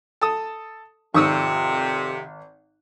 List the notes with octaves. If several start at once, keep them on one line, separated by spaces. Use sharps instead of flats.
A4 A5 D#6
G#1 F2 C3 C#6 D#6 E6